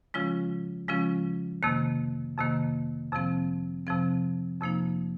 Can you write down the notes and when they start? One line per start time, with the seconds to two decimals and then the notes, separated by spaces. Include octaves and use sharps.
0.14 C#3 F3 G#3 C#4 F4
0.88 C#3 F3 G#3 C#4 F4
1.63 F2 C3 D#3 A#3
2.38 F2 C3 D#3 A#3
3.12 F2 C3 F3 C4
3.87 F2 C3 F3 C4
4.60 F2 C3 F3 A#3 D#4